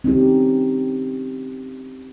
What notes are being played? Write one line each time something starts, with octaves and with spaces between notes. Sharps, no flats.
C4 C#4 D#4 G4